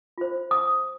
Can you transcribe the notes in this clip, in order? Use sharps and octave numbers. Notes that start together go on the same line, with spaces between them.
F4 C5
D#6